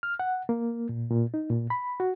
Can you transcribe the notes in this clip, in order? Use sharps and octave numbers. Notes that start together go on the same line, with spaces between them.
F6
F#5
A#3
A#2
A#2
D#4
A#2
B5
F#4